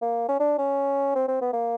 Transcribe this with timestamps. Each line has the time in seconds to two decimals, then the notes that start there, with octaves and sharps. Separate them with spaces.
0.02 A#3
0.29 C#4
0.40 D4
0.58 C#4
1.15 C4
1.28 C4
1.41 B3
1.53 A#3